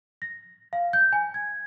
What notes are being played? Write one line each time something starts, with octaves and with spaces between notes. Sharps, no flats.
A#6
F5
G6
G#5
G#6